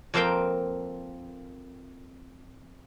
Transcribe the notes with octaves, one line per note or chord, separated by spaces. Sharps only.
F2 A#3 C4 A#4 F5 G5